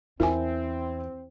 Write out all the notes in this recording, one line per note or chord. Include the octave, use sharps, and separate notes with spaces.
E2 C4 E4 A#4 E5 G#5